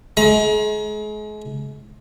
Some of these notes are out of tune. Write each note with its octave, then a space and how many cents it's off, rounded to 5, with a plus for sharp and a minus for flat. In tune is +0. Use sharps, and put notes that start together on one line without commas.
G#3 +35 A#5 +40